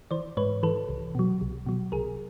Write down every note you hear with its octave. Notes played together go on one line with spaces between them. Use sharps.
E3 C5 D5
G#2 B4 C#5
E3 A4 B4
C2
B2 F#3
C2
B2 F#3
C2 G#4 A#4